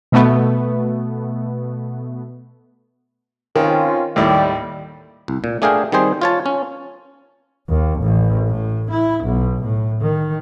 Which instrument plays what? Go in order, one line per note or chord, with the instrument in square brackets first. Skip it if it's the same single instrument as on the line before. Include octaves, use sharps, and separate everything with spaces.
[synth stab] B2 A3 B3
[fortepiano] D#3 [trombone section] C4 C#4 F4
[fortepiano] D#2 A2 E4 [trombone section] G3
[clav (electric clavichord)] C2
A#2
A3 D4 G#4 A#4 F5 G5
D#3 G3 C4 G#4 C5
F4 C#5 A5
C#4
[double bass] D#2
A1
A2
E4
B1
A2
D#3